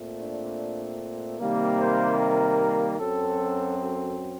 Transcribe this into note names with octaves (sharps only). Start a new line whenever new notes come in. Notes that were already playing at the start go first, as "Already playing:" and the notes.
Already playing: A#2 A3 C4
D4
C3 D#3 G3 A#3
C5
A#4
F#2 F#3 C4 A4
A4